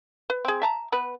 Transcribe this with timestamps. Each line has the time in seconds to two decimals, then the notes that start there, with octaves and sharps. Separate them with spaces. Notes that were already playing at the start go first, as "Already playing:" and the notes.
0.30 B4
0.45 C4 G#4
0.62 E5 A5 A#5
0.92 B3 B4